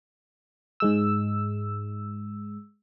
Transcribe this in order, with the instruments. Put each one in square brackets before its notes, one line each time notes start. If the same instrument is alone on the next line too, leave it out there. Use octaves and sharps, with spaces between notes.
[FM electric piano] G#2 G#3 E6